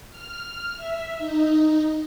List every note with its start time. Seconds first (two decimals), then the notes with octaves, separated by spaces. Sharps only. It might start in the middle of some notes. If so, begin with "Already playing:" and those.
0.10 F6
0.76 E5
1.18 D#4